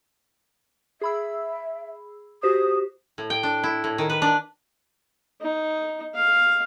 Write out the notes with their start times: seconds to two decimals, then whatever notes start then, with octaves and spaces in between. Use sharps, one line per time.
1.01 G#4 E5 B5 E6
2.43 F#4 G4 C5 D#6
3.18 A2
3.30 G5
3.43 D4
3.64 E4
3.84 A2
3.98 D#3
4.10 B4
4.22 D4
5.41 D#4
6.14 F5